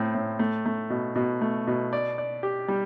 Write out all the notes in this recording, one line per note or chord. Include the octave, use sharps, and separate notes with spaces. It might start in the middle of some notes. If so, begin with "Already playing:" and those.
Already playing: A2 C4
A2
A3
A3
B2
B2
A3
B2
D5
D5
G4
G3